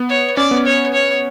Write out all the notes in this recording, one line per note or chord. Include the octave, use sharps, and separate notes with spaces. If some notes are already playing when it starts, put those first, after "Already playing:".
Already playing: B3
C#5
C#4 D5
B3
C#5
C#5